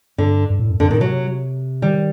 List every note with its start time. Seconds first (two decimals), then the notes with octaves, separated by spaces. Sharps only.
0.18 G2 D3
0.50 G2
0.60 A2
0.70 F#2
0.80 F#2 D3
0.90 A2 D#3
1.00 C3 F#3
1.82 D#3 G3